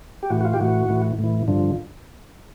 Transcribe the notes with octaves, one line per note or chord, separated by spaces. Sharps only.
G4
A2 E3 F#4
F#4
F4
G4
A2 E3 F#4
A2 E3
A2 E3
G2 D3 F3